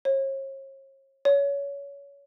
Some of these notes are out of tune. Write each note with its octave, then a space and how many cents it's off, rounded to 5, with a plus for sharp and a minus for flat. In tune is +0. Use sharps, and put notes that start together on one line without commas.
C#5 -40
C#5 +25